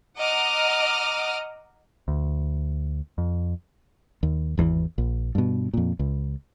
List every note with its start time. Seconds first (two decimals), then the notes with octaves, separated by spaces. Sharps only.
0.19 D#5 F#5 A#5 D6 D#6 F6
2.08 D2
3.18 F2
4.23 D#2
4.57 G#1 E2 C#3 E3
4.98 A#1
5.35 G2 B2
5.74 F2 A#2
5.99 C#2